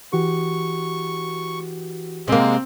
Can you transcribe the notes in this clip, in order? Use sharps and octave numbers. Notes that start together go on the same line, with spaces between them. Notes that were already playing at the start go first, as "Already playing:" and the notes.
E3 F#4 G4 C#6
C3 G#3 A#3 C4